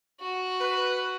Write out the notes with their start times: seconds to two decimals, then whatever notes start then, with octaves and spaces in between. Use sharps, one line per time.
0.20 F#4
0.61 B4